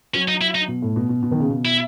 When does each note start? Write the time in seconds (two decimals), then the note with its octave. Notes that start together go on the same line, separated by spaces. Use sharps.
0.14 F#3 C#4
0.28 D#4
0.41 E4
0.55 D#4
0.68 B2
0.82 A2
0.96 B2
1.09 B2
1.23 B2
1.31 D#3
1.40 C#3
1.50 B2
1.65 E4